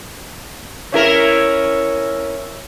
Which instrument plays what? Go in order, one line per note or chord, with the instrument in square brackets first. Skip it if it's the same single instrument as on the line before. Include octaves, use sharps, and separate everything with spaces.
[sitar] C#4 E4 A#4